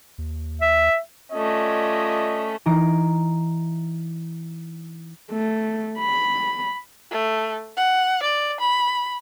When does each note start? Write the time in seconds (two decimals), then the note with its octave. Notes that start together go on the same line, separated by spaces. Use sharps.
0.18 D#2
0.61 E5
1.33 A3 C#4 F4 D5 D#5
2.66 E3 D#4 A#5 D7
5.31 A3
5.99 B5
7.11 A3
7.77 F#5
8.23 D5
8.60 B5